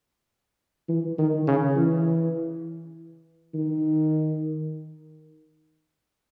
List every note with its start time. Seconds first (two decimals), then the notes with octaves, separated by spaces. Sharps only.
0.89 E3
1.18 D#3
1.47 C#3
1.76 E3
3.54 D#3